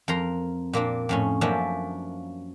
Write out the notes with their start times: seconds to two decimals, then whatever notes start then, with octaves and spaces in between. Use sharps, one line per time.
0.08 F2 A#4 A#5 C6
0.73 A#2 A#3 C4 D4
1.09 F2 A2 C#4
1.41 F#2 F3 A#3 C#4 D4 E5